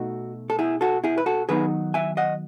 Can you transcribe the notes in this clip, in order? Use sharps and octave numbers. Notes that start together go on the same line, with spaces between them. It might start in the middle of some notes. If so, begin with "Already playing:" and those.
Already playing: B2 A3 D#4 F#4
A4
E4 G#4
F#4 A4
E4 G#4
B4
F#4 A4
D#3 F#3 B3 D#4 G#4 B4
E5 G#5
D#5 F#5